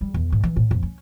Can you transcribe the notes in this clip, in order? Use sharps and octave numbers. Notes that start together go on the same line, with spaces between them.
G3
E2
G#2
E3
A2
F2
C#4